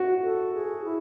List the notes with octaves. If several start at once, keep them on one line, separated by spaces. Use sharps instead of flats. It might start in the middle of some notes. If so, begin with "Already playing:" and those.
Already playing: F#4
A4
G#4
E4